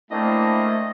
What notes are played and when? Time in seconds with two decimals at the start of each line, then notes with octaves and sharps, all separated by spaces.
0.11 A3 A#3 C4 D4 E4 D#5